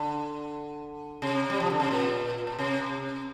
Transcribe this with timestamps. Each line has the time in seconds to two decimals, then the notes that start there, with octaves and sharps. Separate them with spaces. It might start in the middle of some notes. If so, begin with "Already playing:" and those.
Already playing: D3
1.22 C3
1.50 G3
1.60 F3
1.70 D3
1.80 C3
1.91 A#2
2.47 A#2
2.59 C3